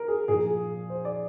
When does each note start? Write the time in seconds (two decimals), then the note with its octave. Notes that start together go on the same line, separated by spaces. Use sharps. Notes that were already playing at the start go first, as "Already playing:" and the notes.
Already playing: A#4
0.08 G#4
0.28 A#2 G#4
0.34 F3
0.89 C5
1.05 D5